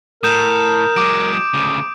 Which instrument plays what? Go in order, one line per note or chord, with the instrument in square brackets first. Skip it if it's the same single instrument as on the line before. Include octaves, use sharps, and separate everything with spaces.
[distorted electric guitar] A2 [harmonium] A#4 [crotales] D#6 G6 E7
[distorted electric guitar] F#3 G#3 [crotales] D6 D7
[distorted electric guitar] D2 C#3